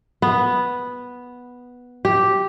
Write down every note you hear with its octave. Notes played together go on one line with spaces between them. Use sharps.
B3
G4